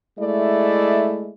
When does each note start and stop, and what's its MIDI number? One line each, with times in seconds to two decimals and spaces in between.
0.19 1.33 56
0.19 1.33 57
0.19 1.33 64
0.19 1.33 74